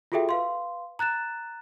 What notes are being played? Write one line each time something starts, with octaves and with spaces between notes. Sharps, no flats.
F4 F#4 G#4 A4 E5 G5
B4 F5 C6
A#5 F#6 A6 E7